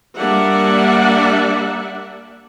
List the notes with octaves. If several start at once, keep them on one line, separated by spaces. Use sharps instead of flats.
G3 A#3 D4 D5 E5 F#5